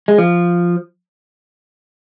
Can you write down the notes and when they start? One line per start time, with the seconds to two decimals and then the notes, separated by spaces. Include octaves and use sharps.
0.08 G#3
0.18 F3